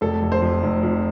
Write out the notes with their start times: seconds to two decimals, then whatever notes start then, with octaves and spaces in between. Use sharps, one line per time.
0.01 F1 A4
0.22 F1
0.32 C5
0.42 F2
0.63 F1
0.83 F2